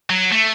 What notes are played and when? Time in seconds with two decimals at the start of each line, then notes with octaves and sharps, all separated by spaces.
0.10 F#3
0.32 A3